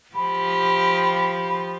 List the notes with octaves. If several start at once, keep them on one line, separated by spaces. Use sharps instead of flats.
F3 G4 B5